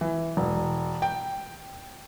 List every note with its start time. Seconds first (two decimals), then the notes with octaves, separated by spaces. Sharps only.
0.01 E3
0.37 E1
1.02 G5